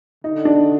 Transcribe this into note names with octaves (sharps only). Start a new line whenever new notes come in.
D3 D#4
D4